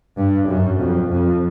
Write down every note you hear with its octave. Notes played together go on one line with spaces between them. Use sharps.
G2
F#2
F2
F2